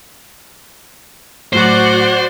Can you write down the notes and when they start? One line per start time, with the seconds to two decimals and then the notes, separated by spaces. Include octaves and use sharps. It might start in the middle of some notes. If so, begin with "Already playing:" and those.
1.53 A2 F#3 F#4 C5 D5 F#5